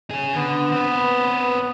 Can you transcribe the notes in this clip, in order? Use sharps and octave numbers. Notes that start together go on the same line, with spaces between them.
C#3 G#4
D3 B3
C4 B4